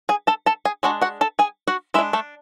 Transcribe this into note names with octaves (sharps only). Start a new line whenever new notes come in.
G#4 G#5
A4 A5
A4 A5
G#4 G#5
G#3 D4 F#4 F#5
F#4 F#5
A4 A5
G#4 G#5
F#4 F#5
G#3 D4 E4 E5
A3 A4